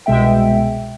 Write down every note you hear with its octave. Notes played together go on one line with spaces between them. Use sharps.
C2 B2 G#3 E5 G5